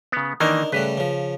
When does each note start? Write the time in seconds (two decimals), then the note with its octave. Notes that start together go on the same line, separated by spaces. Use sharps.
0.12 C#3 B3
0.40 D#3 E3 A#3 D4 D#4 A#4
0.72 C#3 G3 A3 B4
0.98 C#3 F3